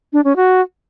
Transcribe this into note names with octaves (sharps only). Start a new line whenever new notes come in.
D4
C#4
F#4